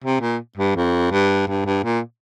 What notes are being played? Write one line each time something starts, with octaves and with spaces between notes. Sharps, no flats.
C3
A#2
G2
F2
G2
G2
G2
A#2